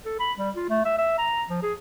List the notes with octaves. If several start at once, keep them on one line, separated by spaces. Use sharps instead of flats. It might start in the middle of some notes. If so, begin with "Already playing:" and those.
A4
B5
G3
F4
A3
E5
E5
A#5
F3
G#4